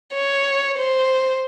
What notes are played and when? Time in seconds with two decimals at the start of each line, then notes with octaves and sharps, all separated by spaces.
0.14 C#5
0.78 C5